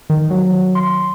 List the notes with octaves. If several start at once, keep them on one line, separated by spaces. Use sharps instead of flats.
D#3
F#3
C6